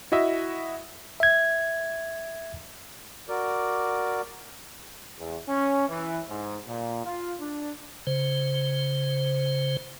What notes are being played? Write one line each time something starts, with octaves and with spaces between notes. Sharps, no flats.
E4 F#4 D#5 E5
E5 G#6
F#4 A#4 D5 D6
E2
C#4
E3
G#2
A#2
F4
D4
C#3 C5